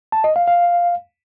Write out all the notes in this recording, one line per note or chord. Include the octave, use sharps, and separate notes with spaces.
A5
D#5
F5
F5